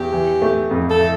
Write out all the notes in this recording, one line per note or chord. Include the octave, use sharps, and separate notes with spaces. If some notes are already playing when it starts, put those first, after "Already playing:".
Already playing: E2 G4
E3
A3
F2
A4
E4